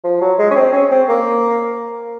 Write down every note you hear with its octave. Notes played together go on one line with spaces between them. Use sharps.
F3
F#3
G#3
C#4
C4
C#4
C4
A#3